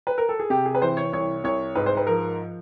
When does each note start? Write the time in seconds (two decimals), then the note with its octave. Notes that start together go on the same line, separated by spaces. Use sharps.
0.07 B4
0.18 A#4
0.29 A4
0.39 G#4
0.50 C3 G4
0.66 G#4
0.75 B4
0.82 E3 C5
0.97 C#5
1.13 C2 C#5
1.44 C2 C#5
1.75 G#2 B4
1.86 C5
1.97 B4
2.07 F3 A#4